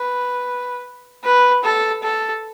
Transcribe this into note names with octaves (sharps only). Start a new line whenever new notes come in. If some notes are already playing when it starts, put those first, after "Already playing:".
Already playing: B4
B4
A4
A4